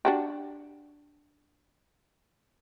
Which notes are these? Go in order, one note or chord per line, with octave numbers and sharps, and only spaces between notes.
D4 F#4 G4